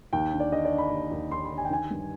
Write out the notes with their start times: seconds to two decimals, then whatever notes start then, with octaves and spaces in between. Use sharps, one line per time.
0.13 D#2 G5
0.32 D3
0.40 D5
0.52 D3 D#5
0.65 D5
0.72 D3
0.78 B5
0.91 D#2
1.12 D#2
1.31 D#2 C6
1.45 B5
1.50 D3
1.58 G#5
1.65 G5
1.70 D#3 G#5
1.91 G2